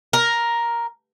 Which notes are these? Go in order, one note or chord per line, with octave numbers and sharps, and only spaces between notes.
A#4